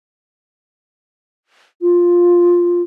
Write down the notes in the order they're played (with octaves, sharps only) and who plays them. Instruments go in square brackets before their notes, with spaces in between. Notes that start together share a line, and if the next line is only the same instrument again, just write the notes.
[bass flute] F4